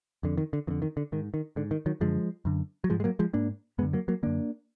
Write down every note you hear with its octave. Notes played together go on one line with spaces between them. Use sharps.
F2 D3
D#3
D3
F2 D3 D#3
D#3
D3
G#2 D#3
D#3
G#2 D3
D#3
D#3 F#3
F#2 D3 F3 G#3
F#2 D3
F#3
G#2 F3 G#3
G#3
F#3 A#3
F3 G#3
G#2 A#3 D4
F#2 D3 G#3 B3
F#3 A#3
F#3 A#3
F#2 D3 A#3 D4